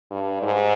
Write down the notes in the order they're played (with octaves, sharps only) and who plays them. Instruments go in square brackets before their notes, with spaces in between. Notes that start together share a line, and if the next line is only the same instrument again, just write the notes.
[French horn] G2
G#2